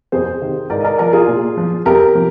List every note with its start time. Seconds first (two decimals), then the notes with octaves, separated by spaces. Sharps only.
0.12 F2 G#4 C5
0.42 C3 D#3
0.70 G#2 A#4 D5
0.81 D#5
0.85 A#4 D5
0.98 F3 A#4 D5
1.13 F4 G#4
1.28 A#2
1.57 F3
1.86 F2 G4 A#4
2.14 C3 F3